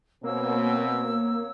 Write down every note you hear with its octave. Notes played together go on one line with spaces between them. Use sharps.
B2 A#3 C4 C#5 E6